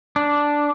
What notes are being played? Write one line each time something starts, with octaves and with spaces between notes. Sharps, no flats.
D4